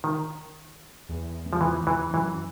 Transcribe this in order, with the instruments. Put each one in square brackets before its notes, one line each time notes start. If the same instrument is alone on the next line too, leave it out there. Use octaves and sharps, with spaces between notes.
[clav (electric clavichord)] D#3
[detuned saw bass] E2
[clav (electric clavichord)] F3
E3
E3
[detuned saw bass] F#2 [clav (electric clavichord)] E3